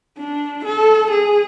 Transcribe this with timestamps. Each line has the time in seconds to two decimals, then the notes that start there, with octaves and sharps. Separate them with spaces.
0.18 D4
0.64 A4
1.10 G#4